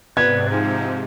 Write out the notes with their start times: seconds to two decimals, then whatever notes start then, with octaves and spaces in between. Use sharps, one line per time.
0.17 G#2 C3 B3 B4 D5 G#6
0.51 F3 D#4